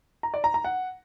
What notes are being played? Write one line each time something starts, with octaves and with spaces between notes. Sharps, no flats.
A#5
D5
A#5
A#5
F#5